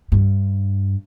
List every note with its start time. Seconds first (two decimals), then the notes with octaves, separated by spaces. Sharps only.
0.12 G2